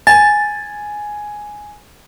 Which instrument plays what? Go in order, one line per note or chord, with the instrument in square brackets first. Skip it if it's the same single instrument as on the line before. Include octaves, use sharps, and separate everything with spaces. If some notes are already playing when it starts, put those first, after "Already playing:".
[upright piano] G#5 [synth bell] A6